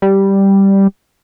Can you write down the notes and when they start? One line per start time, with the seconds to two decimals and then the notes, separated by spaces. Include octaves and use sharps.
0.02 G3